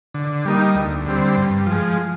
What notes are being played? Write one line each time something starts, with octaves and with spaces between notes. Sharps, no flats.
D3
G3 A#3 D#4
D2
D3 G3 C4
G2
F3 G#3